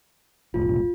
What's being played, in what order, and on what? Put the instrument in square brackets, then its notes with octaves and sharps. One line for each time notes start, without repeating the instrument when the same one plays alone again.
[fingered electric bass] F1 B1 A2 [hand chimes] F4